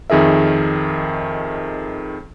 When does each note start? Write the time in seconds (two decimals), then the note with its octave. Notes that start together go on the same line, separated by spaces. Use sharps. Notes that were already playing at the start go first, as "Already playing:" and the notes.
0.10 F2 D#3 G#4 A#4 E5